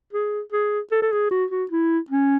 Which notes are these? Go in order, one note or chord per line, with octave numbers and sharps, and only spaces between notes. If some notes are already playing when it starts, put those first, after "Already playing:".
G#4
G#4
A4
A4
G#4
F#4
F#4
E4
C#4